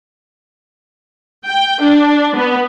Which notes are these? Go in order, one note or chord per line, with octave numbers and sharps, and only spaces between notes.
G5
D4
B3